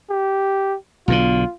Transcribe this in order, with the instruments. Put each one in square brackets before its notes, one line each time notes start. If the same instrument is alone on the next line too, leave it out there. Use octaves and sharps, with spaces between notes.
[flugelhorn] G4
[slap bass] B1 B2 D3 [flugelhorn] F4